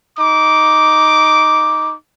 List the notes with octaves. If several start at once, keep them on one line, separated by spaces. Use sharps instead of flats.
D#4 D6